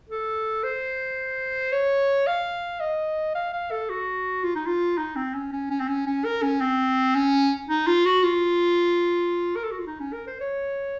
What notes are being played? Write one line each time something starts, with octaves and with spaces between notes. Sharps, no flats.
A4
C5
C#5
F5
D#5
F5
F5
A4
F#4
F4
D#4
F4
D#4
C4
C#4
C#4
C#4
C4
C#4
C#4
A#4
C#4
C4
C#4
D#4
F4
F#4
F4
A#4
A4
F#4
F4
D#4
C#4
A#4
C5
C#5